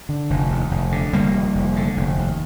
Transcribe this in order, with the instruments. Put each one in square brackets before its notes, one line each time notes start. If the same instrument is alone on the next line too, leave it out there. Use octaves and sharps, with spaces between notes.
[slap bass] D3
F1
D#2
F1
D3
F1 G3 A#3
D#2
F1
D3
F1
D#2